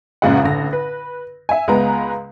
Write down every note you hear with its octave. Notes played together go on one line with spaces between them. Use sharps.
A1 F#2 A#2 C#3 G#3 F#5
A1 D3 A#6
B4
E5 G#5
C#2 G#3 B3 B4 A#5